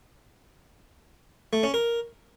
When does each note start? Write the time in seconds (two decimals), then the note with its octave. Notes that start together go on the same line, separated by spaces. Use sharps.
1.53 A3
1.63 C#4
1.74 A#4